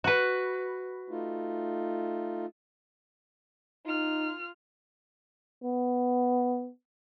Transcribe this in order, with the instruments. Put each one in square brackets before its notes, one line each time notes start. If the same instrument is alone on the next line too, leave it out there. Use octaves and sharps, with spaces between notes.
[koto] F#4 B4
[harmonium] A3 D#4 F4
[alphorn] D#4 [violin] F4 F6
[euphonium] B3